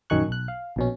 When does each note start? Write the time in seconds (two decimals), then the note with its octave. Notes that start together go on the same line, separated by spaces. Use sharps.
0.10 A#1 F#2 D#3 G#5 C#6 F#6
0.28 B1 F#6
0.48 F5
0.76 A#1 B2 C#4